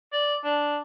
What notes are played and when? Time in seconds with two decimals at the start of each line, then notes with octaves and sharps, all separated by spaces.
0.13 D5
0.44 D4